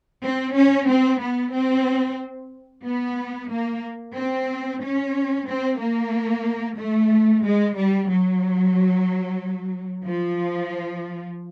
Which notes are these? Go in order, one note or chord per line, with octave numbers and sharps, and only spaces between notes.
C4
C#4
C4
B3
C4
B3
A#3
C4
C#4
C4
A#3
A3
G#3
G3
F#3
F3